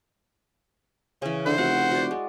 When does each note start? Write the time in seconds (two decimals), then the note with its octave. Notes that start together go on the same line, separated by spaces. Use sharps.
1.22 C#3 E3 C#4
1.46 D3 E4 C5 F#5
1.58 F1 F#4 F#5
1.91 F#4 D5
2.11 G#3